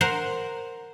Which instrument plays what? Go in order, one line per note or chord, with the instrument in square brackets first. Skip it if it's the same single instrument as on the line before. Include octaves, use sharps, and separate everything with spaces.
[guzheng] A#4 C5 F#5 C6